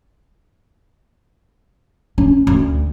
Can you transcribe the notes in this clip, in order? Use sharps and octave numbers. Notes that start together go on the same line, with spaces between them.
C#4
D2